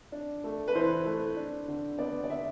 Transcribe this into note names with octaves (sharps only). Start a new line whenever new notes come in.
D4
A3
B4
E3 C5
A3
D4
D3
B3 D5
D5
D3 E5